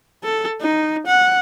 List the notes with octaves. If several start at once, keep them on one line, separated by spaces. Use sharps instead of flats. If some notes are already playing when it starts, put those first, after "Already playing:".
A4
D#4
F#5